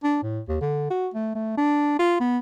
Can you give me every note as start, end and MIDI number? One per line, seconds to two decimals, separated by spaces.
0.04 0.20 62
0.23 0.40 45
0.49 0.56 39
0.61 0.89 50
0.90 1.09 66
1.14 1.34 57
1.35 1.56 57
1.58 1.95 62
1.99 2.17 65
2.20 2.38 59